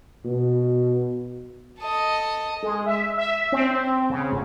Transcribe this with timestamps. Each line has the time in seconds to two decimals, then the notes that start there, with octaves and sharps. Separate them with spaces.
0.25 B2
1.79 A4 D#5
2.62 G#3
2.86 E5
3.18 E5
3.52 C4
4.10 C#3
4.31 G1